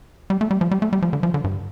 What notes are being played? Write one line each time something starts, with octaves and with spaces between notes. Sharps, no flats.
G3
A3
G3
F3
G3
A3
G3
F3
D3
F3
D3
G2